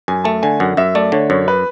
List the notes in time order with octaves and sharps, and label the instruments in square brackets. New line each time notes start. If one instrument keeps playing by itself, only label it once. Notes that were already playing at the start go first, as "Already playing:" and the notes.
[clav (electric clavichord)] F#2 [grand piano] G#5
[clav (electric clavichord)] A3 [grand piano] A5
[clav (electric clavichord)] D3 [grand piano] G#5
[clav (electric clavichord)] F#2 [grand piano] F#5
[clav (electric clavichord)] F#2 [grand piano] E5
[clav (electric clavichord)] A3 [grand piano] D5
[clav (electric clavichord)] D3 [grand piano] C#5
[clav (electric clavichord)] F#2 [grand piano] C#5
[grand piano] B4